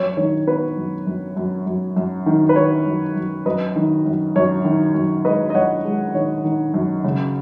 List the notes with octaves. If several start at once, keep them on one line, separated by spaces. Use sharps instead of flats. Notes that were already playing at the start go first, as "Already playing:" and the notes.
Already playing: F#2 C#5
D#3 C#5
B3 B4
F#2
F#2
F#2
F#2
F#2
D#3
B4
D#3 C#5
F#2
F#2
F#2 B4 D#5
D#3
F#2
F#2 C#5
D#3
F#2
G#3 B4 D#5
D#5
F#2 C#5 F#5
G#3
D#3 C#5
D#3
F#2
C#3